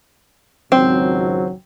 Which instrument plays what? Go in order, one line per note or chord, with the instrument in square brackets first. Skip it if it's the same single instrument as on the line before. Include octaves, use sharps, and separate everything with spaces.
[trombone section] G#1 C#2 F#3 [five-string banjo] C4